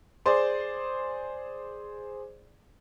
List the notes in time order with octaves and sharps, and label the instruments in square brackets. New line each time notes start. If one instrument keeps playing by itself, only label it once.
[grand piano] G#4 C5 D5 C6